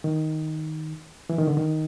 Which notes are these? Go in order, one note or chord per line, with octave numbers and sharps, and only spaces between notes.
D#3
E3
D#3
D3
D#3